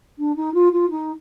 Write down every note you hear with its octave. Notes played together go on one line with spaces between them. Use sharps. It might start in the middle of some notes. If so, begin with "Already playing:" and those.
D4
D#4
F4
F4
D#4